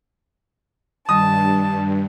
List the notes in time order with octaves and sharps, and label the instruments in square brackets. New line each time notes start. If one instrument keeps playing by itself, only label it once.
[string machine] G2 [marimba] D#3 G3 [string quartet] A5 [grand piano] D#6